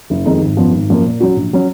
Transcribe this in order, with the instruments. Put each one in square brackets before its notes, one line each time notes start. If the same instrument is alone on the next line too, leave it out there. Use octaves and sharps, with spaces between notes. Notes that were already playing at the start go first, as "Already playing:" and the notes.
[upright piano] F#1
F2 D#3 G#3 D#4
G#1
F#2 F3 B3
G#1
F#2 F3 A#3
A#2
F#3 C#4 F#4
A#1
F#3 C#4